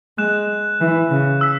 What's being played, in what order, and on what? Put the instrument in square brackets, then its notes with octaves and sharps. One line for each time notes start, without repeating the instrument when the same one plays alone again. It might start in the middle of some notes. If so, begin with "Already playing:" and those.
[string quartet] G#3 [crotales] F#6 E7
[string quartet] E3
C#3
[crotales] E6 B6